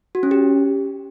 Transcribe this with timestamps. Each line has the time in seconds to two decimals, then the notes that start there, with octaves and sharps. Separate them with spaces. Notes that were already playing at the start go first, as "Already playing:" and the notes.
0.15 F#4
0.23 C#4
0.31 G4